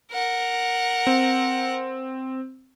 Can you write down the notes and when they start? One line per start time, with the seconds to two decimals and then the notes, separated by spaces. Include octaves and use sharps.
0.12 A#4 F#5
1.07 C4